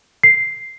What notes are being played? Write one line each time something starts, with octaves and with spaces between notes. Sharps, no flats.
C7